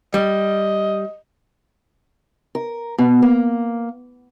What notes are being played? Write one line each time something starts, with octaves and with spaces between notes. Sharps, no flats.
G3 D#5
A#4
B2
A#3